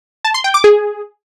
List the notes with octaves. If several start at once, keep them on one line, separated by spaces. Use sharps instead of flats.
A5
C6
G5
D6
G#4